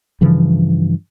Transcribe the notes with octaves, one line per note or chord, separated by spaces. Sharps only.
G2 C#3 E3 F3